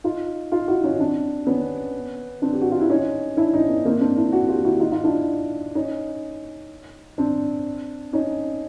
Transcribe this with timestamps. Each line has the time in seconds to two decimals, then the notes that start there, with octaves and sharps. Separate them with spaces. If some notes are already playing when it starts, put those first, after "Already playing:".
0.04 D#4 F4
0.52 D#4 F4
0.68 E4 F#4
0.84 C#4 D#4
1.00 C4 D4
1.47 B3 C#4
2.42 C4 D4
2.53 G4
2.62 F#4
2.71 F4
2.81 E4
2.90 C#4 D#4
3.37 D4 E4
3.53 C#4 D#4
3.69 B3
3.85 A#3 C4
4.00 C4 D4
4.16 D4 E4
4.32 E4 F#4
4.48 F4 G4
4.64 E4 F#4
4.80 D#4 F4
4.92 D#4 F4
5.04 D4 E4
5.75 C#4 D#4
7.18 C4 D4
8.13 C#4 D#4